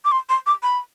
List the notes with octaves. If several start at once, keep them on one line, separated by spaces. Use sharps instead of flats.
D6
C6
C6
D6
B5